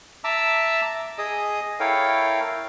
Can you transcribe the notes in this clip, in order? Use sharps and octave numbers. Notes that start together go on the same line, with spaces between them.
E5 A5 A#5 D6 E6
G#4 D#5 D#6
E4 A4 A#4 C#5 F5 G5